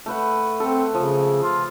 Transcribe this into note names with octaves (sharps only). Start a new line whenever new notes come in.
A3 B4 F#5
C4 A4
C#3 F3
F4